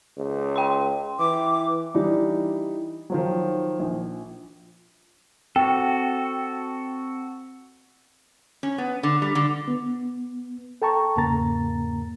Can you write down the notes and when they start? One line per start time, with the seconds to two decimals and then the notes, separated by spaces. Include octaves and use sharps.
0.17 C#2
0.56 G5 C6
1.19 E3 D6
1.94 E3 G3 D4 D#4
3.10 D#3 F3 F#3
3.79 A#1
5.56 C4 F#4 A4 G5
8.63 C#4
8.78 B3
9.03 D3
9.22 G3
9.35 D3
9.68 B3
10.82 A4 G5 A5 A#5 C#6
11.16 E2 G#2 C#3 A#3 A#5 A6